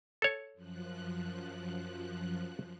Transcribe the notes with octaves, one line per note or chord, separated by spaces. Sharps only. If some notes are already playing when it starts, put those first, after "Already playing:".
A4 C#5
F#2 F3 F#6